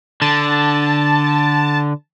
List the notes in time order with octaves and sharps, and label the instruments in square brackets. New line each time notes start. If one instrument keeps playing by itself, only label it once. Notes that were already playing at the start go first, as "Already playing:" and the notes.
[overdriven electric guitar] D3 [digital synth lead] A5